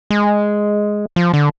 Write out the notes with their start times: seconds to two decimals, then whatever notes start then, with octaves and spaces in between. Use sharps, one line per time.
0.10 G#3
1.16 F3
1.33 D3